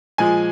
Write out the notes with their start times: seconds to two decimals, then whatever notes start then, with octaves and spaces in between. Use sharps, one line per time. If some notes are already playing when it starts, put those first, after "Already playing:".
0.18 A#2 F3 G#3 G#5